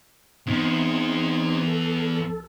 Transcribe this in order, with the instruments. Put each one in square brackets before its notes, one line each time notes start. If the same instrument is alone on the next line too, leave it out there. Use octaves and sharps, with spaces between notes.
[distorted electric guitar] E2 [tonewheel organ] C4 D#4 G#6
[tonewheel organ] A4